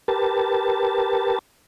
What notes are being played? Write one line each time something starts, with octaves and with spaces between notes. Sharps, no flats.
G4 A#4 B4 A5